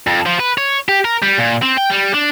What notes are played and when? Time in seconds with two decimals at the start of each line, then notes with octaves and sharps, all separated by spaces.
0.07 F2
0.26 F3
0.39 B4
0.58 C#5
0.89 G4
1.05 A#4
1.22 G3
1.38 A#2
1.62 C4
1.77 G5
1.91 G3
2.14 D4